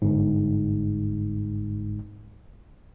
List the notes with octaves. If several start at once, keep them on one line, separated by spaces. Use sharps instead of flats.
G1 G#2